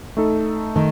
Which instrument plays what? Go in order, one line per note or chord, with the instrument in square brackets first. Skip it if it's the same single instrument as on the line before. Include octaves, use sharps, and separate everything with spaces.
[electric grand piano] A3 D#4 A4
[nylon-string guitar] D#3 [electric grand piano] A3